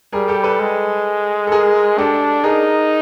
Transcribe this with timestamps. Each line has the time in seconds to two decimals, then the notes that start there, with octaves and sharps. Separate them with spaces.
0.13 G3 G#4 A#4
0.28 G4 A4
0.44 A4 B4
0.60 G#3
1.47 A4
1.52 G#4 A#4
1.98 D4 G4 A4
2.44 D#4 G#4 A#4